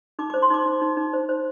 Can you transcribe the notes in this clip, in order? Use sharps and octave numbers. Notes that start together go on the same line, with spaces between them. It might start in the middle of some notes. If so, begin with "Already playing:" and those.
D#4 D6
C5 D6
C6
D#4 D6
D#4
D#4
D#4
C5
C5